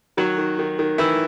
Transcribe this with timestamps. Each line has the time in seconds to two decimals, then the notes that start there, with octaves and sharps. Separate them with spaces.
0.17 D#3 F#3 F#4
0.38 D#3
0.59 D#3
0.79 D#3
0.98 D#3 E3 E4